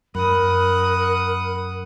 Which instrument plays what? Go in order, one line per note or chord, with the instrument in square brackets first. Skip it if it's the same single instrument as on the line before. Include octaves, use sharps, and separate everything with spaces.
[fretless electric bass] F#2 [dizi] A#4 [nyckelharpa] F#5 D#6 [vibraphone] B5